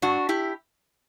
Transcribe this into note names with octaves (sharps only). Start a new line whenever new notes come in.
G2 D4 F#4
E4 G4